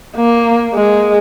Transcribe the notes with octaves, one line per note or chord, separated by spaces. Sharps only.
A#3
G#3